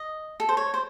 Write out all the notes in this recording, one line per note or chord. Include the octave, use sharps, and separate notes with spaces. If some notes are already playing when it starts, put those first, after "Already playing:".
Already playing: D#5
A4
C5
C#5
C5